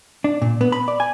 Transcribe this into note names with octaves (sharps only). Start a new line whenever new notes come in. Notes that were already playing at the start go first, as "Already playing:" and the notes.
D4
A#2
B3
B5
D5
G#5